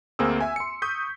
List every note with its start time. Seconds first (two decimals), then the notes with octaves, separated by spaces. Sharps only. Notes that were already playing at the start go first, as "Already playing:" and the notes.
0.19 D2 A#3 C4 G#4 E6
0.41 E5 G#5
0.56 C6 C#7
0.82 C#6 D#6 G6 B6